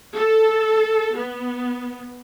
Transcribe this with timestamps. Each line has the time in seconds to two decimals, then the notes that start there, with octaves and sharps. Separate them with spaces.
0.15 A4
1.15 B3